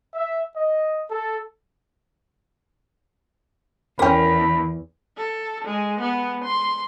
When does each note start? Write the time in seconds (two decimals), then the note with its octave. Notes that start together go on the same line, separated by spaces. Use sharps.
0.14 E5
0.54 D#5
1.09 A4
3.99 E2 D3 C#4 A#4 G5 B5
5.17 A4
5.65 G#3
6.01 B3
6.44 C6